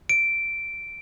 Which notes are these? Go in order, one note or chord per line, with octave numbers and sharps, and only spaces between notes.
D7